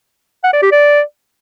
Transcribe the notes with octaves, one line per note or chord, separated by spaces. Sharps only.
F#5
D5
G4
D5